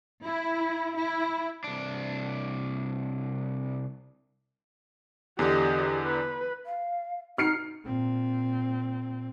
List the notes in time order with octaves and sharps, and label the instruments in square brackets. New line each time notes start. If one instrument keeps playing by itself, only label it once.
[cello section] E4
E4
[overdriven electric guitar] C2 D4
[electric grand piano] E2 D3 [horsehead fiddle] G4 D#5
[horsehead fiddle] B4
[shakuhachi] F5
[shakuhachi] D#4 [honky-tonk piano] F6 C7 C#7
[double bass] A#2 C4